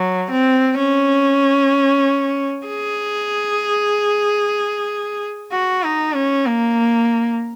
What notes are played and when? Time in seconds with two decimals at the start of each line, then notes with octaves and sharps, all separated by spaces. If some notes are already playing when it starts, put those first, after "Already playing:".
Already playing: F#3
0.31 C4
0.78 C#4
2.68 G#4
5.52 F#4
5.83 D#4
6.15 C#4
6.46 A#3